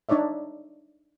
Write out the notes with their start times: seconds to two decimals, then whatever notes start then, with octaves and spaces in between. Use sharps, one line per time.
0.09 D4 D#4 C#5 D5 E5